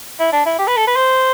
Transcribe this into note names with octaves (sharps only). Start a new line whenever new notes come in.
E4
D4
E4
G4
B4
A4
B4
C5